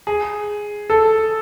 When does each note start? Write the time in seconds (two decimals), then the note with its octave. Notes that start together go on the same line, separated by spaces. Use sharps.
0.07 G#4
0.90 A4